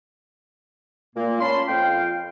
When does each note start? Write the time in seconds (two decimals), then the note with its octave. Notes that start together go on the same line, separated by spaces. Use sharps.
1.16 A#2 A#3
1.40 C#4 A#4 A5 B5 C6
1.68 F2 F5 G5